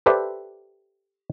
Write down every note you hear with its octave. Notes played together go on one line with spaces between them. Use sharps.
G4 A4 B4 C5 D5 E5